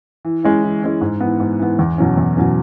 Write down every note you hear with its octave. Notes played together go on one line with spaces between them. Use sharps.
E3
G#3 C#4 E4
E3
G#3 C#4 E4
G#2
E3 B3
G#2
E3 B3
E2
B2 F#3 C#4
E2
B2 F#3 C#4